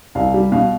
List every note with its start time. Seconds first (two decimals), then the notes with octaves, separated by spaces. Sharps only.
0.15 C2 F5
0.34 G3
0.52 B2 F5